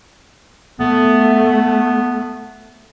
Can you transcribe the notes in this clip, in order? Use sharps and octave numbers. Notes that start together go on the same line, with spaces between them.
A3 B3